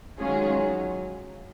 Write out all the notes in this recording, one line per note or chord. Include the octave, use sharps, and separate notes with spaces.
D#3 F#3 G#3 C#4 F4 G#4